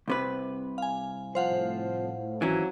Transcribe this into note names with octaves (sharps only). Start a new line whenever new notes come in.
C2 C3 B4
F5 G#5
F3 C5 F5 F#5
A2
G#1 E3 F#3 C#4